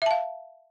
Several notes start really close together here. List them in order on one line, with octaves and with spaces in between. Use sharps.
E5 A5 F5